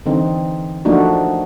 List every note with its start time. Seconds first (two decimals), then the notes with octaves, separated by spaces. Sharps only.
0.06 D3 E3 C4 D#4
0.85 F3 A3 A#3 D4 D#4 F#4